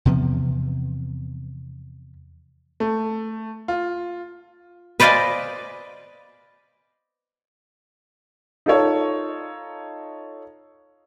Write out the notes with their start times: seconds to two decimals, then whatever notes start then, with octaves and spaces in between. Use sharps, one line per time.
0.05 E2 C3 F3 B3
2.80 A3
3.68 F4
5.00 B4 C5 D5 D#5 F5 G#5
8.66 D#4 F4 A4 C#5